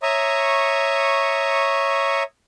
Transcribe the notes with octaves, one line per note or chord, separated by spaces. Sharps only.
C#5 E5 A#5 C#6 D#6